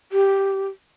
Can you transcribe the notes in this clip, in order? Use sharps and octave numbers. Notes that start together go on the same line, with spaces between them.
G4